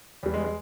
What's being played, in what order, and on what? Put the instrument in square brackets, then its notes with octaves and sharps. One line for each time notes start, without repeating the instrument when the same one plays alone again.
[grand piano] E2 E3 G3
[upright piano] G#3
G#3